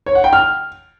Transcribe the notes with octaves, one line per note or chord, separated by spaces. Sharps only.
C#5
F#5
G5
F6